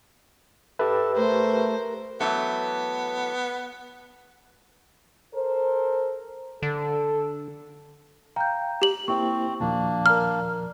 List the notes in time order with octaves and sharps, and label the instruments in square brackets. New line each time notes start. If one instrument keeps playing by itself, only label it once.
[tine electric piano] G4 B4 [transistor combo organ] A4 E5
[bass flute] A3 [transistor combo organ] A#4 [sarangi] C5
[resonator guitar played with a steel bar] E3 F#3 A3 [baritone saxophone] B3
[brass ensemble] A4 A#4 C5
[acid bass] D3 [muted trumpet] A4
[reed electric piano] F5 G5 [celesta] A#5 G6
[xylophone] G4 F#7
[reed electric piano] A#3 E4 C5 [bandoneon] C4 [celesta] C#6
[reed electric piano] D#2 A#2 F3 [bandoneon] A#3 D4
[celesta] A#4 D5 A#5 [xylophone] F6